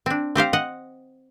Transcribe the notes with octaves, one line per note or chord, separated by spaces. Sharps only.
C4 D4
C4 G4 C5 F5
D#5 F#5